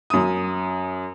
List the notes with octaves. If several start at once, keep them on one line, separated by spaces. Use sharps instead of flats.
F#2 D#6